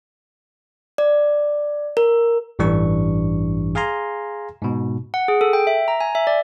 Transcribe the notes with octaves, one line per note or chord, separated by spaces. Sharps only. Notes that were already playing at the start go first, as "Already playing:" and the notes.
D5
A#4
A1 G2 E3 G3 D4 C#6
G#4 F5 G#5 A#5 C6
G#2 B2
F#5
G#4
A4
G5
E5
A#5
G#5
E5
D5